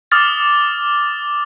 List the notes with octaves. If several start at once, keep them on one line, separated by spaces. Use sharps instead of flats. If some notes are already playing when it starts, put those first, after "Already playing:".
D6 D#6 F6 A6